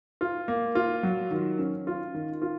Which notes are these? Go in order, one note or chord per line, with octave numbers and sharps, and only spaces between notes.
F4
A#3
F4
F#3
D#3
C#4
F4
D#3
F4